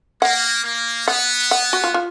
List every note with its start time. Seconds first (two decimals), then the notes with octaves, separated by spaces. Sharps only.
0.22 A#3 F#5
0.64 A#3
1.07 B3 F#5
1.51 F#5
1.73 F#4
1.84 F4
1.94 F4